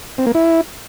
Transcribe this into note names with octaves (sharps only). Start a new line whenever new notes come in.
C4
A#3
E4